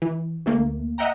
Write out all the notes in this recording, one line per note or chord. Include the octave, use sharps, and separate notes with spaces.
E3
D2 A3 A#3
D#5 E5 F#5 G5 A#5